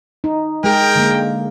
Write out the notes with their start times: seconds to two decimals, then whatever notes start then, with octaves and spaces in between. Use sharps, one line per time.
0.24 D#4
0.64 G#3 G#4 A#4 G5
0.95 D3 G#3 A#3